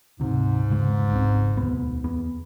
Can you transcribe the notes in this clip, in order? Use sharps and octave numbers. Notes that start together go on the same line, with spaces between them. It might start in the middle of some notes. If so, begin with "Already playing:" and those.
D2 G#2 C3
E1 C#3 G#3
G#1 C#2 C4
E1 D2 B3
E2 B3